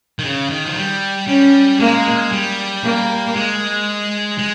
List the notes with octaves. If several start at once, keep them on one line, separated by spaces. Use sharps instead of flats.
D#3
C#3
D#3
F3
G3
G3 C#4
G#3 A#3
G3
A#3
G#3
G#3